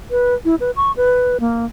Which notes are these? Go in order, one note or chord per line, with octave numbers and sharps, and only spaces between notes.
B4
E4
B4
C#6
B4
A#3